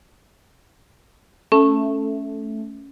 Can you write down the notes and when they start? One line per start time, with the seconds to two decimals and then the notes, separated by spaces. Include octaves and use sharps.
1.52 A3 C#4